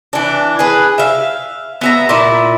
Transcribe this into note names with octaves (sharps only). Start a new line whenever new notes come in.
E3 D4
G#4 B4
E5 F5
B3 E5 A#5
A#2 E4